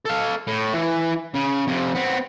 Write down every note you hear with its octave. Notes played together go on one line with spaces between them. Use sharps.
A4 F5
A2
E3
C#3
F2 C3
B3 C4